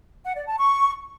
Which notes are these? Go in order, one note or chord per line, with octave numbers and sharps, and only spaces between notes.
F#5
D5
A5
C#6